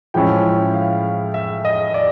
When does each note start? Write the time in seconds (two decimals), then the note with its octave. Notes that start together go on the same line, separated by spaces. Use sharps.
0.14 A2 F3 G#3 C#4 E4 G5
0.74 F5
1.34 E5
1.65 D#5
1.94 D5